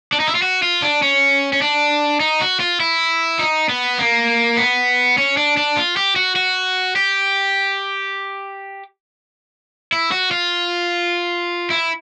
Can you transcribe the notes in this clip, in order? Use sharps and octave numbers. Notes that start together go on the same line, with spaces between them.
D4
D#4
E4
F4
F#4
F4
D4
C#4
C#4
D4
D#4
F#4
F4
E4
D#4
B3
A#3
B3
C#4
D4
D4
F4
G4
F#4
F#4
G4
E4
F#4
F4
E4